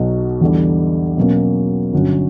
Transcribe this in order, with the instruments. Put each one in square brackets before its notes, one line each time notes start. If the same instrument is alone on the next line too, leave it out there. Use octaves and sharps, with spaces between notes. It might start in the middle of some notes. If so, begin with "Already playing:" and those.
Already playing: [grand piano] B1 B2 F#3
E2 D3 G3
B2 F#3 A#3 C#4
G1 G2 F#3 C#4 F#4